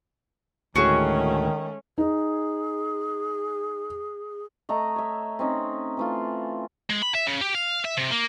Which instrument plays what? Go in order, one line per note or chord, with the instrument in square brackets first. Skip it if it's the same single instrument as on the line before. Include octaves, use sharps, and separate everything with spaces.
[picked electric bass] D2 A2 [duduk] D#3 [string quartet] G#3 A3 C#4 [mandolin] F#4 G#4
[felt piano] D#4 [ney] G#4
[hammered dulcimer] A3 D#5 A#5
C#5 E5
C4 C#4 D#4
E3 A3 F4
[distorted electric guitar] G#3
B5
E5
C#3
G4
F5
E5
C3
A#3